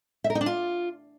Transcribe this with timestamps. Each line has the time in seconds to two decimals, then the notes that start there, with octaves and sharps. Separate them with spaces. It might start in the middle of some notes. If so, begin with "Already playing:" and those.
0.24 E5
0.30 A#4
0.35 D#4
0.41 D4
0.46 F4